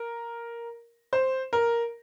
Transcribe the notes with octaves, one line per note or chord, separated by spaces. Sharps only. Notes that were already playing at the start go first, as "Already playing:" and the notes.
Already playing: A#4
C5
A#4